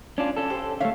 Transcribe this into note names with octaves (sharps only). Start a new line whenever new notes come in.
C#4 D4 F4
C#4 A4
G4 C5
D3 A3 C#5 E5 F5